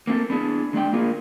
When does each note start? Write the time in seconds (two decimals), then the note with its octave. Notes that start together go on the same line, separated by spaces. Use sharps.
0.07 A#3 C4 F4 A4
0.30 B3 D4 E4 G#4
0.73 D3 G#3 D5 G5
0.93 A#3 F4 G#4 A#4